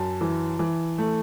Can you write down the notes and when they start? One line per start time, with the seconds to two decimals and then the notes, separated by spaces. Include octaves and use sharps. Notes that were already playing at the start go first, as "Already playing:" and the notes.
Already playing: F#2 A5
0.21 E3
0.59 E3
0.98 A3